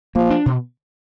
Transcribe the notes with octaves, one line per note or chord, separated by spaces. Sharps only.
F3 A#3
D4
B2